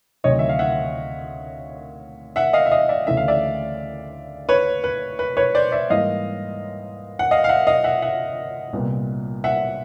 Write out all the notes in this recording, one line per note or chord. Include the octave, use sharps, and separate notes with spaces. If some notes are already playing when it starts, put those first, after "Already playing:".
D2 C3 D#3 F#3 C#5 D#5
E5
F5
E5 F#5
E5 F#5
D#5 F5
E5
D#5 F5
D5 E5
D2 C#3 E3 A3 E5
F5
D5 E5
B4 C#5
B4
B4
B4 C#5
C5 D5
D5 E5
G#2 E3 G3 A#3 D#5 F5
F#5
D#5 F5
F5
E5 F#5
D#5 F5
E5 F#5
E5 F#5
C2 A#2 G3 B3
E5 F#5